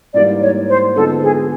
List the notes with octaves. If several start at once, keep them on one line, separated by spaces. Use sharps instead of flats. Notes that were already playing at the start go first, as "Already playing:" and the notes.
G#2 E3 G3 A#3 D5
C#5
C5
D3 F3 G#3 B3 D#4 A4
G#4